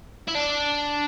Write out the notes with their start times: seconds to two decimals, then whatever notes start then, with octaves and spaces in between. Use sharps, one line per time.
0.28 E4
0.34 D4